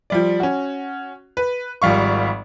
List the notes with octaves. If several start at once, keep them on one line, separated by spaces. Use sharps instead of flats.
F3 G3 D5
C#4 F#4
B4
G#1 F3 G3 F5 C#6